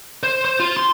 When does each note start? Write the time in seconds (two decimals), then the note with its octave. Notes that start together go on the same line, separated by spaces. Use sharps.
0.23 C5
0.45 C5
0.60 F4
0.77 C6